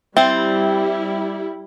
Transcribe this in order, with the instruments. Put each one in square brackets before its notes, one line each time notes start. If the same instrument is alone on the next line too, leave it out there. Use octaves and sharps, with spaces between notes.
[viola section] G3 E4 [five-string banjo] C4 [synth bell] E5 G5